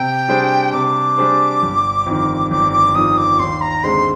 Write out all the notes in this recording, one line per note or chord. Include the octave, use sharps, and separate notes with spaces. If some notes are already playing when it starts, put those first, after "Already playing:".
Already playing: C3 G5
G3 D4 G#4 C5
C3 D6
G3 D4 G#4 C5
G1
F2 D#3
G1 D6
D6
F2 D#3 D#6
D6
D#2 C6
A#5
D3 G#3 C4 C6